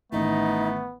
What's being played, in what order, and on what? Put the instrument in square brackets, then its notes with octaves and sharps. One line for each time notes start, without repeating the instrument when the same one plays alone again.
[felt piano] A1 D#3 E3 [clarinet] A3 [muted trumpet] B3 [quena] D#4